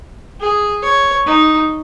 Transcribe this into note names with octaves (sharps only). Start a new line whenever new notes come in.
G#4
C#5
D#4